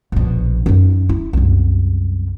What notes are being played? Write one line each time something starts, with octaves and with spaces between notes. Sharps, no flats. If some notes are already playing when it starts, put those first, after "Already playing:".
A#1 B2
F#2 D#4
E4
C2 F#2